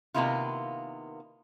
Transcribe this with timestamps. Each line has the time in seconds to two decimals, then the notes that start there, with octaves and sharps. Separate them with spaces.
0.14 C3 D#3 A#3 B3 E4 F4